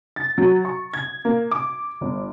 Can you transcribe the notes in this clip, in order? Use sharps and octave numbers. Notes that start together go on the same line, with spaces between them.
A6
F#3
C#6
G#6
A#3
D6
G1